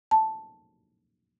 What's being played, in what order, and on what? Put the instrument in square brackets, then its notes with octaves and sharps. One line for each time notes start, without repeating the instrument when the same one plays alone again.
[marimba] A5